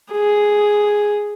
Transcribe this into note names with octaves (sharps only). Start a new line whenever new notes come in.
G#4